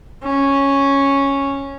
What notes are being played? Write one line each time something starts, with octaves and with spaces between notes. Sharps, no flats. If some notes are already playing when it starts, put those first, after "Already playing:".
C#4